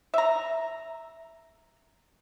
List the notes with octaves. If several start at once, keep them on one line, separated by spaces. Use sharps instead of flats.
E5 A#5